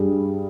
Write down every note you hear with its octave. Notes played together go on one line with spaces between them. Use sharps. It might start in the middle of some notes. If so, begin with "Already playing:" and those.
Already playing: G2 G3 G#4